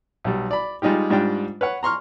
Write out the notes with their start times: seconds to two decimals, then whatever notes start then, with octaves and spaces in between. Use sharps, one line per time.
0.25 B1 G3
0.51 D5 B5
0.82 G3 G#3 D#4 F4 G4
1.10 G#2 G3 D4 F4 G5
1.61 B4 C#5 F#5
1.83 A#5 C6 C#6 F6